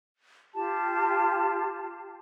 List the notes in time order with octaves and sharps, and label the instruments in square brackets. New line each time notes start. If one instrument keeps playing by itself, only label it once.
[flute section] F4 G4 A5